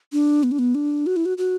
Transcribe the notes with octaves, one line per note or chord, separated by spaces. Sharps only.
D4
B3
D4
B3
D4
F#4
E4
F#4
F#4